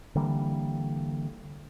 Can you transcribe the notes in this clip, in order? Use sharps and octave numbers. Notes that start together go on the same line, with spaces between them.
D3 E3 G3 A#3